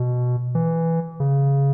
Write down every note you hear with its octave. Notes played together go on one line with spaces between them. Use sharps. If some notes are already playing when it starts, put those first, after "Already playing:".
Already playing: B2
E3
C#3